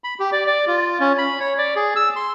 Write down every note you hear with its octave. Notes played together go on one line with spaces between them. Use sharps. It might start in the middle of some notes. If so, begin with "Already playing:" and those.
B5
G4
D5
D5
F4
C#4
B5
C#5
D5
G#4
E6
C6